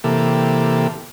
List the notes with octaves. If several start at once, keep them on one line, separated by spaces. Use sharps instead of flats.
C3 E3 A#3 G4 A4